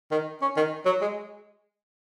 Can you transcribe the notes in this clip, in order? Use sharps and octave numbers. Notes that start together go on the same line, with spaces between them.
D#3
C#4
D#3
F#3
G#3